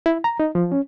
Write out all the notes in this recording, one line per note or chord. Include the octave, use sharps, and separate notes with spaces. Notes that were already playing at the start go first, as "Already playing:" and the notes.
E4
A#5
D#4
F3
C#4